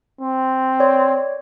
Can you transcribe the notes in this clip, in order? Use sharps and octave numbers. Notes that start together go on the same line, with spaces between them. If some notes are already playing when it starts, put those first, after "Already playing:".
C4
C#5 D5